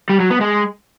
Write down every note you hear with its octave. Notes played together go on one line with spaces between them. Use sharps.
G3
F#3
B3
G#3